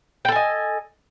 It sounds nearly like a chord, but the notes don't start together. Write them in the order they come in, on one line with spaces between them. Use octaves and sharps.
G5 A4 G#5 D#5